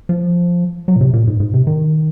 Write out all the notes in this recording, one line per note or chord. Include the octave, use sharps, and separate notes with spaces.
F3
F#3
A#2
C3
A#2
G#2
G#2
C3
D#3